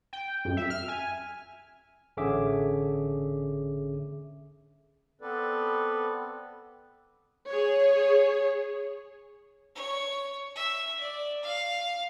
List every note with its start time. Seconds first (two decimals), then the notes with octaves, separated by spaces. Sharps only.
0.13 G5
0.45 F#2
0.57 E5
0.70 F6
0.88 G#5
2.17 A1 D3 C#4 G#4 E5 D6
5.21 B3 C4 A4 B4 D5
7.49 G#4 C#5
9.75 C#5
10.56 E5
11.00 D5
11.43 F5